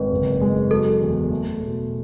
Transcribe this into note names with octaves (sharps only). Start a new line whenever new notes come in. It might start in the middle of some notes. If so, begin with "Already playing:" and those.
Already playing: G#1 B4
F#1
G#3
F#3 A4
E2
A3
B2